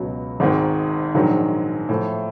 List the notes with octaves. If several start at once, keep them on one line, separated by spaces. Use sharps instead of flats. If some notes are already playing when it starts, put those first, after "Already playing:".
Already playing: C#2 B2 F#3
G#1 G#2 D#3
A#1 G#2 D#3 F#3
A2 F3 A3